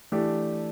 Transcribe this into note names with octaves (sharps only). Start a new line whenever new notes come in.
E3 A3 D4 G4